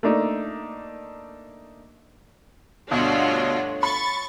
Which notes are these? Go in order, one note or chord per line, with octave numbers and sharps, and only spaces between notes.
A3 A#3 D4 D#4
D2 G2 B2 A3 D4 F4 F#4 C#5
B5 C#6 A6